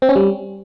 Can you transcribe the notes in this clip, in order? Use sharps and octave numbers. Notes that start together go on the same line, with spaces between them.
C4
C#4
G3